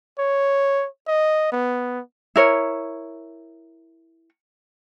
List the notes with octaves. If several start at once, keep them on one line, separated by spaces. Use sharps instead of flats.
C#5
D#5
B3
E4 A#4 C#5